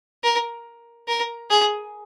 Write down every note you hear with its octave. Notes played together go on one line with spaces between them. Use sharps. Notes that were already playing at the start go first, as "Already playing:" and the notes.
A#4
A#4
G#4